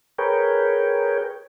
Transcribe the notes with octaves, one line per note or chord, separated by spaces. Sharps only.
G#4 A#4 B4 C#5 G5